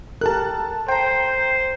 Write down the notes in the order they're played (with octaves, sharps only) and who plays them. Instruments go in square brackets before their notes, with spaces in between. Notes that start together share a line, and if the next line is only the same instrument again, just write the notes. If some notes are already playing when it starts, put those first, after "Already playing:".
[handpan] G4 A4 A#4 [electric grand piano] A5 F#6
[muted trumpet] C5 [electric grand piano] G5 A#5